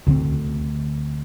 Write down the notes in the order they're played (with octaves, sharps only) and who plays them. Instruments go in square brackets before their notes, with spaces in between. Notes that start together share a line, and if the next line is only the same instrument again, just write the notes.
[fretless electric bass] D2 D3 A3 C4